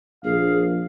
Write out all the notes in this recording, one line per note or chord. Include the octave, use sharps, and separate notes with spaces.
A#1 G#4 F5